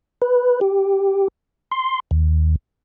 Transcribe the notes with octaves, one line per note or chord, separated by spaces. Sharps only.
B4
G4
C6
D#2